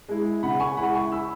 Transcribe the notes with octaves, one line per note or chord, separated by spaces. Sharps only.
G#3 E4
C#3 F#5 B5
G#5 C#6
G#3 E4 F#5 B5
G#5 C#6
B5 E6